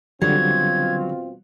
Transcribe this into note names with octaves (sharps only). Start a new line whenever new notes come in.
B2 D3 F#3 G3 C4 F4 G#6